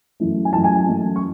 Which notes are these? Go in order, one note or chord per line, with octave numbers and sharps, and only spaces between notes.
F#2 E3 A3
G#5
F#2 E3 A3 A5
G#5
G#5
F#2 E3 A3
C#6